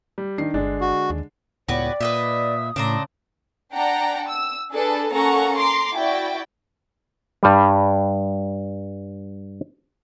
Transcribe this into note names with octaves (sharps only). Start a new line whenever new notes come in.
G3
D#3 D4 C7
G1 D3 G#3 D4
F#4
D#2
C#2 A2 B3 F#4 G4 B4 C#5 D5
A#2 B4 D#5 E5 D#6
A2 C#3 D4 C5 A#5
D4 D5 F#5 G5 A#5
E6
D4 G#4 A4 B4
A#3 C#4 A4 F#5 A#5 C#6
A#5 C6 D6
E4 F#4 D5 G5
G2 G3